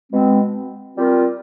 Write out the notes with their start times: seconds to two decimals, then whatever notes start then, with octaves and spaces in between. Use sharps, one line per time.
0.11 B2 G#3 C4
0.96 G3 C4 F4 A#4